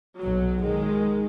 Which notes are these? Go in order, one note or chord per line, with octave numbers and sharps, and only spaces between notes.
B1 F#3
D#3 G#3